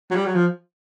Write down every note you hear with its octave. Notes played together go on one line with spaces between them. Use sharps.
F#3
G3
F#3
F3